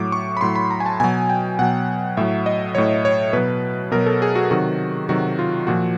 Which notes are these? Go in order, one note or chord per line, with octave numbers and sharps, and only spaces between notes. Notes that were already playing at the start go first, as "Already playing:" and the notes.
Already playing: A2 F#3 D6
C#6
B5
A2 F#3 C6
B5
A#5
G#5
A5
B2 F#3 G#5
G5
B2 F#3 F#5
A2 F#3 E5
D#5
A2 F#3 C#5
C#5
B2 F#3 B4
B2 F#3 A#4
A4
G#4
F#4
C3 D#3 F#3 F#4
C3 D#3 F#3 F#4
F4
A#2 F3 F#4